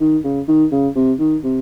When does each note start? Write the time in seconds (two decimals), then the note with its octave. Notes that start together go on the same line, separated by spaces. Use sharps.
0.01 D#3
0.24 C#3
0.48 D#3
0.72 C#3
0.96 C3
1.19 D#3
1.43 C3